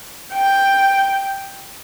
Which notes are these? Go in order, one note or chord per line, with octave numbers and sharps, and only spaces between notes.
G5